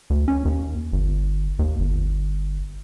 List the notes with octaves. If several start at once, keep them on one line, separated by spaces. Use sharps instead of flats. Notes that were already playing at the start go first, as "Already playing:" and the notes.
D2
C#4
D#2
G1
D#2
G1